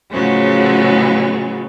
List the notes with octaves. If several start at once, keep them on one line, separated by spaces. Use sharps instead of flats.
A2 C#3 F3 F#3 G#3 B3